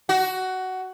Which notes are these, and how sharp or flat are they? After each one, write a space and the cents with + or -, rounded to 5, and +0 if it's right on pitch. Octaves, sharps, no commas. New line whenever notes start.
F#4 +15